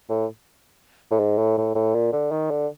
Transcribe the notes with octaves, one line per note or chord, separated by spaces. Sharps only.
A2
A2
G#2
A2
A2
A2
A#2
D3
D#3
D3